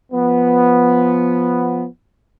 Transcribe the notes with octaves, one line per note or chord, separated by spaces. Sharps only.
F3 B3